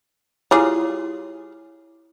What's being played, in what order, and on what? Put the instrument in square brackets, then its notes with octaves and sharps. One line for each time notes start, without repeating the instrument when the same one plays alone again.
[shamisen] G3 F4 G#4 [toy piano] E4 C#5